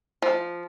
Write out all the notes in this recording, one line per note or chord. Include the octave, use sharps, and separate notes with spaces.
F3